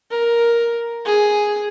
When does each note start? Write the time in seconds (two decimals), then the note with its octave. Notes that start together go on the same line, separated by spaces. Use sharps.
0.11 A#4
1.05 G#4